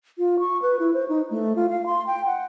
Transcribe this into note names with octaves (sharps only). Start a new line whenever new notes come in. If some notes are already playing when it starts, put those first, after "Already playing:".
F4
C#6
B4
E4
C5
D#4
A3
F4
F5
C6
G5
F#5